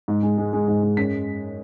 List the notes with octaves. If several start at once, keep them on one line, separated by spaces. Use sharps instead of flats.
G#2
G#3
G#3
G#3
G#2
G#3
F#2 B6